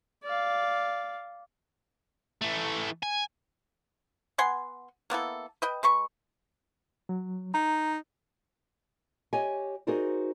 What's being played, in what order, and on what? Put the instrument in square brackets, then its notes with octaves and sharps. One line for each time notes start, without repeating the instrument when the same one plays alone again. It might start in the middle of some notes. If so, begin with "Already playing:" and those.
[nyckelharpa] D5 F5
[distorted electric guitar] E3 A3
G#5
[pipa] B3 F#5 G#5 C6
A#3 B3 E4 A4
B4 D#5 G5
G#3 B4 C#6
[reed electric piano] F#3
[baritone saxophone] D#4 [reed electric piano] A#5
[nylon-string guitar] G4 C#5 D#5 G#5
D#4 F#4 G#4 A#4 C5 D5